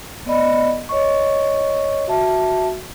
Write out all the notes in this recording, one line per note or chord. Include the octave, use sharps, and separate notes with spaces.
B3 D5 D#5 B5
C#5 D#5 C#6
F#4 E5 A5